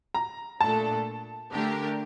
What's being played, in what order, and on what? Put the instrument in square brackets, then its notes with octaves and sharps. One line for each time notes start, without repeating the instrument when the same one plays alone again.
[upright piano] A#5
[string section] A#2 A3 D4 A4 [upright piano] A5
[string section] D3 A3 D4 G4 A#4